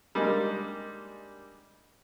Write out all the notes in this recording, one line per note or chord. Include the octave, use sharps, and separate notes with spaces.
G3 G#3 A#3 D4 D#4